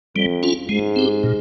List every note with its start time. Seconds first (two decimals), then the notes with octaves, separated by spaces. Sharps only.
0.16 F2 G3
0.43 C#4 F4
0.69 G#2 G#3
0.96 C4 G4
1.24 A#2